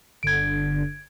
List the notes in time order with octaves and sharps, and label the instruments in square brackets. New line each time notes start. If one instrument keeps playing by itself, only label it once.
[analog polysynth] G1 D3 [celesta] G#6 D7